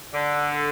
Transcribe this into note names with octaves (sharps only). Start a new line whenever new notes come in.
D3